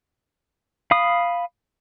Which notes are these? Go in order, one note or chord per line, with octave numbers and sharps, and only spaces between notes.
F5 B5 D#6